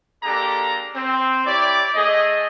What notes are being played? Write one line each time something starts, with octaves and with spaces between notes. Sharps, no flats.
G#3 A#3 D4 G4 A4 A#5
C4
E4 G4 C#5 D5
A3 G#4 D#5